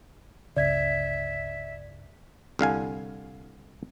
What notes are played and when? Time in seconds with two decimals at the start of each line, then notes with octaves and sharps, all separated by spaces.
0.57 G1 C#2 C#3 D5 E5 G#6
2.59 C2 D3 F5 G#5